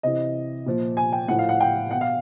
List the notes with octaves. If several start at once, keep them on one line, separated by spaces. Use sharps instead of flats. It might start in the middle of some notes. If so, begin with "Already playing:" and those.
C3 E3 D#5
A#2 F3
G#5
G5
A2 F3 F#5
F5
F#5
G5
B2 F#5
F5